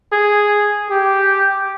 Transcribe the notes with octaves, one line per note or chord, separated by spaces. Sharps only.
G#4
G4